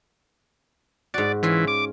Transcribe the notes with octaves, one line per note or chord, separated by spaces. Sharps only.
G#2 F#4 D5
E3 C#4 F4
D6